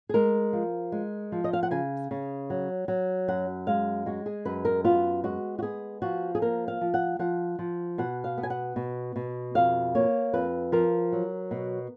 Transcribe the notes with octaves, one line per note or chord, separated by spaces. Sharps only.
G#4
G#3 A#4
F3
G#3
F3
D#5
F5
F#5
C#3 G#5
C#3
F#3
F#3
F#2 F#5
G#3 F5
G#3 F#4
G#4
F#2 B4
A#4
B3 F4
G#3 F#4
F#4
B3 G#4
F3 F#4
G#4
A#3 A#4
F5
F3
F#5
F3 F#5
F3
B2 F#5
F5
B3
G#5
F#5
B2
B2
F2 F5
A#3 C#5
F2 B4
F3 A#4
F#3
B2